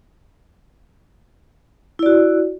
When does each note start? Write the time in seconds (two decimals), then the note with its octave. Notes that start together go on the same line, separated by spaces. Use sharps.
1.99 E4
2.03 D5
2.06 F#4